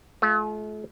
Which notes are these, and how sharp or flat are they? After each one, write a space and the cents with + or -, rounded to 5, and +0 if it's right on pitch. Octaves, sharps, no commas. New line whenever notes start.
A3 -45 F4 +0